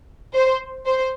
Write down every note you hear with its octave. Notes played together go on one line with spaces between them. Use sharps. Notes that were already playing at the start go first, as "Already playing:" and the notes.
C5
C5